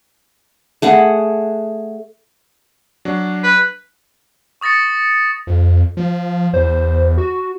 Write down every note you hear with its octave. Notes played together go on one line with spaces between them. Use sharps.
A3 G#4 F#5
F#3 D4
B4
C#6 D#6 A6 A#6 C#7
F2
F3
E2 C5
F#4